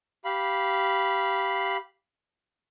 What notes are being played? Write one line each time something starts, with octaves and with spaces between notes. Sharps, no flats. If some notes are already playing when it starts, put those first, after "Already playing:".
G4 F5 B5